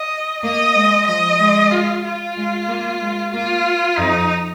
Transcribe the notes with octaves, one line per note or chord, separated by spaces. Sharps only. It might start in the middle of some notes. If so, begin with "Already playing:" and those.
Already playing: D#5
A#3 D#5
G#3
F3 D#5
G#3
F4
F4
G#3
A#3
G#3
A#3 F4
F2 D#4